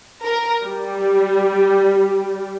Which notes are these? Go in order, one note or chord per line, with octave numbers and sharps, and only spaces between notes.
A#4
G3